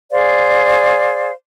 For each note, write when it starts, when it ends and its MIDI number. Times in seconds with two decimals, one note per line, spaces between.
0.10 1.31 68
0.10 1.31 72
0.10 1.31 74
0.10 1.31 77